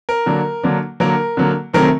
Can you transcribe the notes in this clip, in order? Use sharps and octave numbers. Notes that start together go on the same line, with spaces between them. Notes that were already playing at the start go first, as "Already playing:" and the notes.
A#4
D3 F#3 A#3 D4
D3 F#3 A#3 D4
D3 F#3 A#3 A#4
D3 F#3 A#3
C3 D#3 F#3 A3 C4 A#4